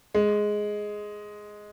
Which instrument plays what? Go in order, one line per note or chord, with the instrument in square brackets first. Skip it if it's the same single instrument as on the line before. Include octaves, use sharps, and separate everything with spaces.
[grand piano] G#3